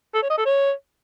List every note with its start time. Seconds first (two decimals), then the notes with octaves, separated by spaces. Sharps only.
0.14 A4
0.22 C#5
0.30 D#5
0.38 A4
0.45 C#5